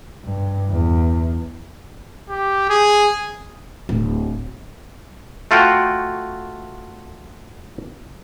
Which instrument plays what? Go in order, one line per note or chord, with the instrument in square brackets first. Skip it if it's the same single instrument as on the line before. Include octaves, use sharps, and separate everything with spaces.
[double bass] G2
E2
[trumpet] G4
G#4
[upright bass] D1
[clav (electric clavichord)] A3 F4 F#4 G5